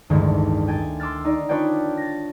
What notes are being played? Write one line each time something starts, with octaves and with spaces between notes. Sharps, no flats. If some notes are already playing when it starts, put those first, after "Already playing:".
A1 D2 G2 D#3 G#3
G5 G#5 G#6 A6
C6 D6 E6 F6 A6
D#4 D5
D4 F4 B4 C#5 D5 G5
A6 A#6